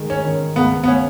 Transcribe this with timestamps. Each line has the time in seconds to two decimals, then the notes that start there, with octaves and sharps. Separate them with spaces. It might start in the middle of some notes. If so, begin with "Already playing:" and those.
Already playing: D#3 G#3
0.10 C#4
0.25 D#3
0.56 C#2 B3
0.84 B3
0.88 C#4